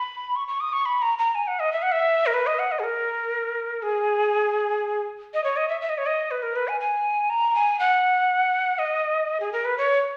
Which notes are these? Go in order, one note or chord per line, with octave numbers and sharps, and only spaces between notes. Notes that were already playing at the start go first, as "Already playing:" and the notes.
Already playing: B5
C#6
C#6
D#6
C#6
B5
A#5
A#5
G#5
F#5
D#5
E5
F#5
E5
A#4
B4
D#5
F#5
D#5
G#4
A#4
G#4
D#5
C#5
D#5
E5
E5
D#5
C#5
D#5
B4
A#4
B4
G#5
G#5
A#5
G#5
F#5
D#5
G#4
A#4
B4
C#5